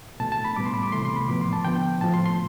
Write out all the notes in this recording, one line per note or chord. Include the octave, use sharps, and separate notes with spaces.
B2 A3 A5
A5
B5
A2 G3 B3 D6
C6
B5
D6
C3 E3 A3 C6
C6
B5
A2 F3 B3 D6
C6
A5
D3 F3 B3 G5
A2 F3 A3 A5
C6
C6